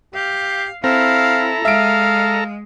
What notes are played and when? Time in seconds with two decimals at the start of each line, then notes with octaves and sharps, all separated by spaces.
0.14 G4 F5
0.84 C4 E4 A4 F5 A#5
1.65 G#3 E5 F5 D7